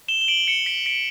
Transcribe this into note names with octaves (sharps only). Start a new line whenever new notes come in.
E7 G7
G7
D7 F#7
C#7 E7
B6 D7
B6 D7